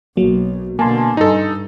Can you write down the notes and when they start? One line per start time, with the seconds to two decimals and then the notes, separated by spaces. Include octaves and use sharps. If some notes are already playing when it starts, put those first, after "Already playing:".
0.17 B1 F#3 A#3
0.79 B2 D3 A#3 G#5 A5 C6
1.17 G2 D#4 A4